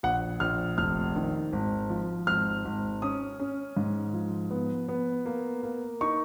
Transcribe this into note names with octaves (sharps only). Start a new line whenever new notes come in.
A#1 F#5
A#1 F6
F1 F6
D#3
G#1
F3
G#1 F6
G#1
C#4 D#6
C#4
G#2
F3
B3
B3
A#3
A#3
D#4 C#6